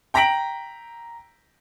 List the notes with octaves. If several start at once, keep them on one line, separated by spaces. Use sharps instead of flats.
G5 A#5 A#6 B6 D7 F#7